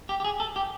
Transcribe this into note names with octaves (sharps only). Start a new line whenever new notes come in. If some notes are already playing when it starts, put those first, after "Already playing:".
G4
G4
G#4
A4
G4